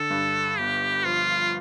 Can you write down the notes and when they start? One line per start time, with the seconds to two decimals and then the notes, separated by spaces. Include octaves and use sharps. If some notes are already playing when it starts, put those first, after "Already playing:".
Already playing: D3 A4
0.10 G2
0.58 G1 G4
1.05 F3 F4